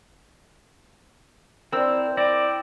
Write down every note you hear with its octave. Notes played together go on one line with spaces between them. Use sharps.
C4 E4 A#4 C5 D5 E6
E4 D5 G5 A#6